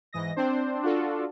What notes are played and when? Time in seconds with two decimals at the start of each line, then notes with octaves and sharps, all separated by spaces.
0.13 G#2 E3 D#5 A#6
0.36 C4 D4 C5
0.83 D4 F4 F#4 A4